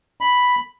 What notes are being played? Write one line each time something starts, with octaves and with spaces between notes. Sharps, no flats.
B5